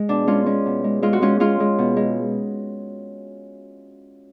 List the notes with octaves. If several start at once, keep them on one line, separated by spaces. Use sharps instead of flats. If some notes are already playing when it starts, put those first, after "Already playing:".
Already playing: G#3
B2 D4
G#3 C#4 F4
G#3 C#4
B2
G#3
G#3 F4
F#4
G#3 C#4 F4
G#3 C#4 F4
G#3
B2
G#3